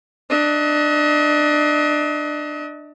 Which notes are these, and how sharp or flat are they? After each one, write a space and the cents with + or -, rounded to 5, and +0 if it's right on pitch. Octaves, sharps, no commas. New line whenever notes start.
D4 +20 D#5 +40